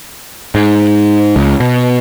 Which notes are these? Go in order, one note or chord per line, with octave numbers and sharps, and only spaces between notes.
G#2
C#2
B2